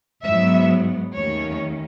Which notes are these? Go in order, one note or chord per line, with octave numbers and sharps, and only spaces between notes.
G#2 F#3 B3 E5
D#2 D#3 A3 C#4 C#5